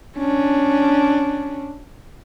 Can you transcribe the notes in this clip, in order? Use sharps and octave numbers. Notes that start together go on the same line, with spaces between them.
C#4 D4